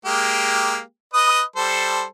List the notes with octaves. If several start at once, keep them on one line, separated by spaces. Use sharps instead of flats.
G#3 A#3 G4
B4 D#5 D#6
G3 A4 C5